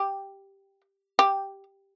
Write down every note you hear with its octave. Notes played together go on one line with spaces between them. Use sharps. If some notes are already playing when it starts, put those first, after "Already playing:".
Already playing: G4
G4